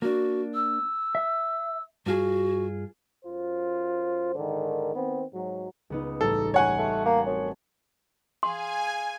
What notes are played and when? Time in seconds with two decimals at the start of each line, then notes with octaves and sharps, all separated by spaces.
0.02 A#3 D4 F#4
0.55 E6
1.15 E5
2.06 G2 F4 F#4 G#4
3.25 F#2 F4 C5
4.36 G#2 D3 D#3
4.95 D#3 B3 C4
5.33 G#2 F#3
5.90 C#2 B3 D#4
6.21 A1 G3 A4 A#5
6.54 C#5 F#5 G#5
6.78 A3 C6
7.05 A#3 A5
7.26 F#2 C4
8.43 G#4 F5 G#5 C6